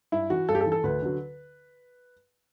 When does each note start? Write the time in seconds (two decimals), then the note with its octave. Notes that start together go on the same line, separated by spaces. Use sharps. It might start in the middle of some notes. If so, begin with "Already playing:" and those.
0.12 G2 E4
0.30 E3 F#4
0.49 G2 A4
0.55 G4
0.61 A4
0.66 E3
0.72 A4
0.84 D2 B4
1.02 D3 F#3